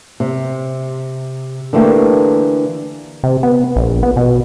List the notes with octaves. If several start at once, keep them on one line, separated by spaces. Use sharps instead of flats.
C3
D3 E3 A3 A#3 G4
C3
B3
A#1
B3
B2